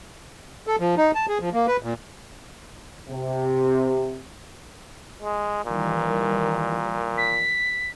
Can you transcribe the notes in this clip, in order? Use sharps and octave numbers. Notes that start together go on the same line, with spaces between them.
A4
F3
D#4
A5
G#4
F3
A#3
B4
A#2
C3
G#3
A#2 D#3 E3 G3
B6